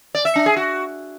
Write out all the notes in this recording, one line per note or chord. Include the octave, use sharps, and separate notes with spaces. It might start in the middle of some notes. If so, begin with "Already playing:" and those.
D5
E5
D4
G#4
F#4